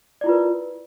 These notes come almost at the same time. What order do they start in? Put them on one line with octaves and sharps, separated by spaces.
D5 E4 F4 B4 A#4